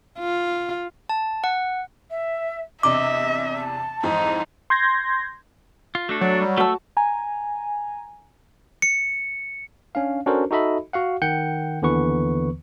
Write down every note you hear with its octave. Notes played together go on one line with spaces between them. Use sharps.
F4
A5
F#5
E5
E2 C3 D4 D#5 E5 D6
A5
F2 G#2 E3 D#4
C6 G6 G#6 A#6
F4
A3 D4 F#4 A4
F#3 D5
G3
A3 F#4 A5 E6
G#5 A#5
C#7
C#4 D4 F5
C#4 D4 F#4 A4 A#4 C5
D#4 F#4 A4 D#5 E5 B5
F#4 F5 F#5
D#3 F#5 G5 G6 C#7
D#2 D3 E3 B3 B4 C#6